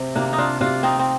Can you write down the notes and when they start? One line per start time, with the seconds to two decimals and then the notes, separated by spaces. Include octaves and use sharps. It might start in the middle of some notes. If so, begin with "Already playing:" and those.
Already playing: C3 C4
0.15 C3 A#3 D4
0.33 D#4
0.38 D4 F4
0.61 C3 D4 F4
0.83 C4 D#4
0.99 C4